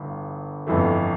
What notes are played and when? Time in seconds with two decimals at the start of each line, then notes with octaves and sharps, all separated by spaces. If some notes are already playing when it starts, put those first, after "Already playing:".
Already playing: G1 G2 E3
0.67 G1 F2 E3 A3